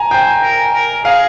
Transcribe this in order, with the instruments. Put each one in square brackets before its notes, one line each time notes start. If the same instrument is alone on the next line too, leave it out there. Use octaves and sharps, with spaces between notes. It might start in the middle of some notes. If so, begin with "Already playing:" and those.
Already playing: [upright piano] G#5 A#5
[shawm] C5 [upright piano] G5
[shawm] A#4
A#4
[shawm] G#4 [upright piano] F5